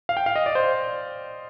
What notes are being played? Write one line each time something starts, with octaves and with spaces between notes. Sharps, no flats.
F5
G5
F5
D#5
D5
C5